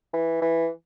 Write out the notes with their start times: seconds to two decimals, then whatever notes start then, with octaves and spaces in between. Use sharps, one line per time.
0.14 E3
0.42 E3